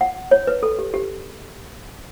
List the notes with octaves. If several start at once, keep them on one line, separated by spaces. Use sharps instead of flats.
F#5
C#5
B4
A4
G4
G4